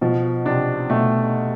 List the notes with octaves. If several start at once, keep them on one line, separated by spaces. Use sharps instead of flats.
B2 F3
C3 D4
B2 A3